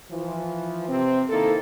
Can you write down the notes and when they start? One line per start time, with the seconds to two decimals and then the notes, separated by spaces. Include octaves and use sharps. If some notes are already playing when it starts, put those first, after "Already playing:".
0.11 E3 F3
0.89 C3 C4
1.29 D#3 A#3 E4 A4